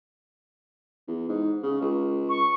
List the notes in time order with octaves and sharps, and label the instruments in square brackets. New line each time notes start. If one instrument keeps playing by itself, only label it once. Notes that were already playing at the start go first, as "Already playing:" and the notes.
[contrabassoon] E2
G#2
C#3
C#2
[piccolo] C#6